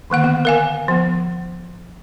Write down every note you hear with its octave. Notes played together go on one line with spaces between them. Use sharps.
D3 D#3 A#3 F#5
B3
A#4 F5 G#5
F3 B3